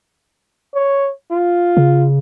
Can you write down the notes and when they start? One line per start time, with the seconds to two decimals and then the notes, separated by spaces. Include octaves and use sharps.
0.75 C#5
1.31 F4
1.77 C#3